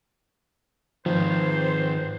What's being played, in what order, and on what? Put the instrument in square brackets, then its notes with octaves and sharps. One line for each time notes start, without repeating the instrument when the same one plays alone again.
[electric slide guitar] G#2 D#3 [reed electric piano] F3 [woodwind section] C4 B4 C5